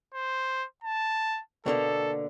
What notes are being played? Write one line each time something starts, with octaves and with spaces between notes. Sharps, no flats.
C5
A5
B2 D3 A#3 A4